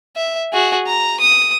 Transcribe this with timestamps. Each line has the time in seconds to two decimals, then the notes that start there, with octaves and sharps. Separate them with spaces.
0.16 E5
0.53 F#4 G#4
0.87 A#5
1.20 D#6